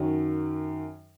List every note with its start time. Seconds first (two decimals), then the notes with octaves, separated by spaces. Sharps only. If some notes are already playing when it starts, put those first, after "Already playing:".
Already playing: F#2 D#3 F#3